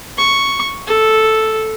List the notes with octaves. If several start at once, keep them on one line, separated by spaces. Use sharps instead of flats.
C#6
A4